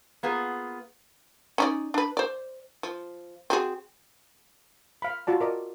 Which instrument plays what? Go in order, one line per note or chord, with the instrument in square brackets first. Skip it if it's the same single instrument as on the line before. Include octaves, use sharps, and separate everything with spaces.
[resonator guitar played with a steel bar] A#3 B3 F4 G#4
[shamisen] C#4 D#4 D5
D4 B4
C5 D5
F3
C4 F#4 G#4
[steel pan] F5 B5
F4 F#4 D5 A5
A#4 D5 D#5